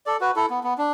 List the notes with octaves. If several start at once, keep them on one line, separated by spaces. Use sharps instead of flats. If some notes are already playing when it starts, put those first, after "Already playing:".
A4 D5
F#4 B4
E4 A4
B3
B3
D4